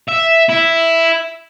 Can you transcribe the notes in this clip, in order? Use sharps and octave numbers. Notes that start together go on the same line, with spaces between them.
E5
E4